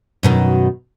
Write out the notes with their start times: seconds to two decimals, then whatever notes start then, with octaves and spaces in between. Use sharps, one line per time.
0.23 F#2 B2 D#3